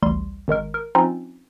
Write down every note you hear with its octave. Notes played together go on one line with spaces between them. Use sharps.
A1 D2 G3 C6
G#1 D#3 G#3 A#4
A#4
F3 C4 C#4 D#4 F4